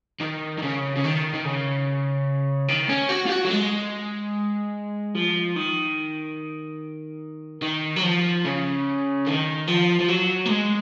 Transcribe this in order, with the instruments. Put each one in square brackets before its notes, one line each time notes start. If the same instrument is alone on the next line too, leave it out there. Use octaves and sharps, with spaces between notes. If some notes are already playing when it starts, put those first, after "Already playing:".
[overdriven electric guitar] D#3
D#3
C#3
C#3
D#3
D#3
C#3
D#3
C#4
F#4
F4
F#4
F#3
G#3
F3
D#3
D#3
F#3
F3
C#3
D#3
F3
F3
F#3
A#3
G#3